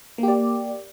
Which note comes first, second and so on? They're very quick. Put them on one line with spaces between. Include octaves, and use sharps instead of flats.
A#3 G4 D5